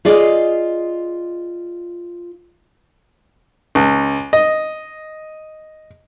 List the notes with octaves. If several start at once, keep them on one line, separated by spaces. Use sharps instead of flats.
F4 G#4 D5 D#5
C#2
D#5